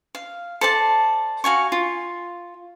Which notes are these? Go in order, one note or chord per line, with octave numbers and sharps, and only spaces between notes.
F5
A4 C5 D5 A5
F#4 F5 G#5 C#6
F4